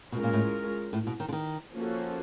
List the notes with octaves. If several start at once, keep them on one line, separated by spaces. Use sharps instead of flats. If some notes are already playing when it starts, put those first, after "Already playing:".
B2 G#3 C#4 F4 A#4
A#2
A2
A2
B2
D#3
D3
D#3
F3 A#3 C#4 F#4 A4